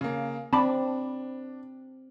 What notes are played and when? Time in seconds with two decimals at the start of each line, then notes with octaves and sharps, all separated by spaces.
0.01 C#3 A#3
0.53 C4 D4 A5 B5 D6